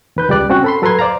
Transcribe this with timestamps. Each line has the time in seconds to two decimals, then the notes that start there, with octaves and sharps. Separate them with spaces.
0.16 D#2 B4 G6
0.29 C#2 G3 D5 F#6
0.50 C4 C#4 F#4 F#5 G5
0.64 A4 B5 C6
0.82 F#3 A4 B4 A#5 C6 G#6
0.99 C5 D5 F5 A#5